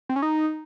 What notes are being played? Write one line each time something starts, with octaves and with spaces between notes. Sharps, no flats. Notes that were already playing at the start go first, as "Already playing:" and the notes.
C4
C#4
D#4